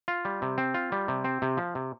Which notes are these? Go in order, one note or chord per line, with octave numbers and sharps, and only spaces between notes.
F4
G3
C3
C4
F4
G3
C3
C4
C3
F3
C3